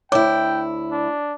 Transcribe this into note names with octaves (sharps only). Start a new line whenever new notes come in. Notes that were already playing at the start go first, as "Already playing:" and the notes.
D2 E4 C#5 G5 D6
D4